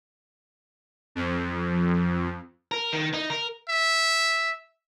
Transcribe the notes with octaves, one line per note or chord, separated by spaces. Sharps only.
F2
A#4
D#3
D#4
A#4
E5